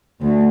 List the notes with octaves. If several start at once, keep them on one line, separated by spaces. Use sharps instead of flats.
D2